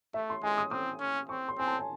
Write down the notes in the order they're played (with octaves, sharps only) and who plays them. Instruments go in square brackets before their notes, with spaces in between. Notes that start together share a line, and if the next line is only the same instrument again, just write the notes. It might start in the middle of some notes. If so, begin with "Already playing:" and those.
[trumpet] A3 [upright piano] E5
[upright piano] C6
[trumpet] G#3 [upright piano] G#5
[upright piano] D#6
[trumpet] C4 [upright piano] D#6
[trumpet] C#4
[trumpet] C4 [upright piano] C#6
[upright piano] C6
[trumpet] C4 [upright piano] G#5
[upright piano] A5
G#5